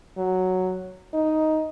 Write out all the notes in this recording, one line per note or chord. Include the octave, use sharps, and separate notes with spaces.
F#3
D#4